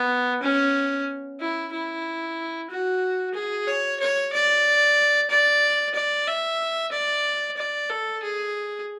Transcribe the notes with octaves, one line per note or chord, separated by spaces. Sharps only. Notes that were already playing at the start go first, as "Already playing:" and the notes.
Already playing: B3
C#4
E4
E4
F#4
G#4
C#5
C#5
D5
D5
D5
E5
D5
D5
A4
G#4